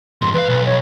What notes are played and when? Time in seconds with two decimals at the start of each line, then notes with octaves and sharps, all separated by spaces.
0.22 F2 G#2 C6
0.34 E2 B4 F5
0.49 B1
0.66 C#5